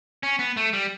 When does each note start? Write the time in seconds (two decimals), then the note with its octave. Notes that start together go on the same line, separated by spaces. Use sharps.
0.23 C#4
0.39 B3
0.57 A3
0.73 G3